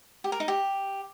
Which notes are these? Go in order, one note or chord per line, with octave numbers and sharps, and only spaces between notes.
G4
A#4
D#4
G4